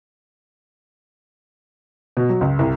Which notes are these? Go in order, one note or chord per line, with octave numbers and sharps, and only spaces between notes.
B2
F#3
C#2
C2